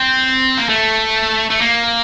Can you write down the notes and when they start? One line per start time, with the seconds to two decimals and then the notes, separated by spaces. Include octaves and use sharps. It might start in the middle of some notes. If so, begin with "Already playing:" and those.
Already playing: C4
0.57 A#3
0.69 A3
1.50 A3
1.61 A#3